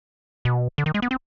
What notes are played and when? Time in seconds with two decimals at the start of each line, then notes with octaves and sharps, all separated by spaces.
0.45 B2
0.78 D3
0.86 D#3
0.94 G#3
1.02 B3
1.11 C4